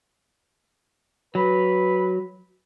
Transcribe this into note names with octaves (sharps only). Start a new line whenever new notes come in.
F#3 B4